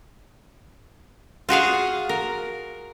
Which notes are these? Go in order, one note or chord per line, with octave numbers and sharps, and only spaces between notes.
F4 F#4 G#4 F5
A#4